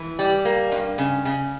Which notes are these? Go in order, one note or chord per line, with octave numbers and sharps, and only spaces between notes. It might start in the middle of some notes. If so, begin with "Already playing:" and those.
Already playing: E3
G3
A#3
G2
C#3
C#3